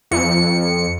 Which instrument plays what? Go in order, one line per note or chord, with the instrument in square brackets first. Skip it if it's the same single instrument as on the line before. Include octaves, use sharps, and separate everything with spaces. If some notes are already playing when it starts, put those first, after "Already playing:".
[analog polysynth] F2 C#7